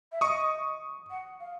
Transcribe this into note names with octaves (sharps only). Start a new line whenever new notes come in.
E5
D#5 C#6 D#6
F#5
F5